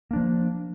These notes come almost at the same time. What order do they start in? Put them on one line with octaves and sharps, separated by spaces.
A#3 D4 F3